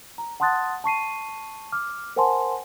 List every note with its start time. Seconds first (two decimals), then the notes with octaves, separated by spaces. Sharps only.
0.18 A#5
0.40 F#5 A5 C6 D#6 F#6 A6
0.84 A5 C#6 C7 D#7
1.72 D6 F6
2.16 A#4 C5 F#5 G#5 A5 C6